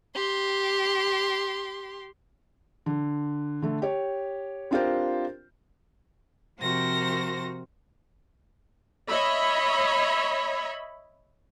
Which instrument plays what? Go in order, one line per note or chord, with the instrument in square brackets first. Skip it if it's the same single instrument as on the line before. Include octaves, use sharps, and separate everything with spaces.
[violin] G4 C6
[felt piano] D3
D3 A3
G4 C#5
C4 D4 F4 G4 A#4 C5
[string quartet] C3 F3 F#4 A#4 C5 A#6
[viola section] C#5 D#5 E5 B5